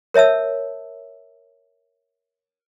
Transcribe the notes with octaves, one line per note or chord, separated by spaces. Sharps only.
A#4 C#5 E5 A5 E6